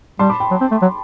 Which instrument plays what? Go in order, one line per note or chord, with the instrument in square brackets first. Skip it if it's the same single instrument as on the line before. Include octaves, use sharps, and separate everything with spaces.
[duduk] G3 [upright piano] A5 C6
[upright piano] B5 D6
G5 B5
[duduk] F#3
C4
A3
F#3